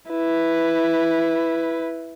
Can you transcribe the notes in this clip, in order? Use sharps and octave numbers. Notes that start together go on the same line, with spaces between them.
E4 B4